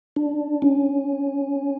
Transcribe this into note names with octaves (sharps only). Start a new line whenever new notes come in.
D4
C#4